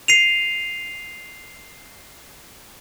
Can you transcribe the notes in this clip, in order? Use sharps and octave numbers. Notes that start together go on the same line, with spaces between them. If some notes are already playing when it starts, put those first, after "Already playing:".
C7 D#7 F7